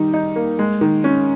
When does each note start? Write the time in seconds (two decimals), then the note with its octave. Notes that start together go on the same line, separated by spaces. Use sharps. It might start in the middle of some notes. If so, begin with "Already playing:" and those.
Already playing: D#3 G3 D#4
0.14 D#4
0.36 A#3
0.59 G#3
0.81 D#3
1.04 C#4